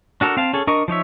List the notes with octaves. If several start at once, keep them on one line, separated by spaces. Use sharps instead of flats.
D4 F#4 A4 A#4
C4 F5 A5
C#4 G#4 A4
D4 A#4 D#5 C#6
F3 D#4 C#5 E5